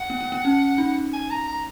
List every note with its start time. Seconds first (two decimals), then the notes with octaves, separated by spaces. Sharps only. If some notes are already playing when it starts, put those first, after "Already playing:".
Already playing: F#5
0.10 B3
0.21 B3
0.32 B3
0.45 C#4
0.78 D#4
1.13 G#5
1.31 A#5
1.48 A#5